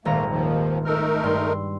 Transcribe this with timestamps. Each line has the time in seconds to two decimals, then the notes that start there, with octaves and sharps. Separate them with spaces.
0.05 D#1 G#1 A3 A#3 A#5
0.30 D#2 D#3 F3
0.85 A3 D#4 A#4 E6 F6
1.24 G2 C6